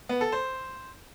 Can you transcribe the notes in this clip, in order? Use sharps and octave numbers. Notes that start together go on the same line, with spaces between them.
B3
A4
C5